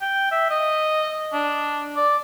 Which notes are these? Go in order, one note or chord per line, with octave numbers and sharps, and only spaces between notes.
G5
E5
D#5
D4
D5